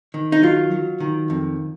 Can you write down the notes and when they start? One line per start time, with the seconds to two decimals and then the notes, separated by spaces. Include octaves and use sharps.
0.14 D#3
0.32 D#4
0.42 F#3 F4
0.71 F#3
1.00 D#3
1.30 F2